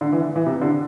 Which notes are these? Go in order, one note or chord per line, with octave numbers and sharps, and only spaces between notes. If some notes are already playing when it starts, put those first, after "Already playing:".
D3
E3
E3
C3
D3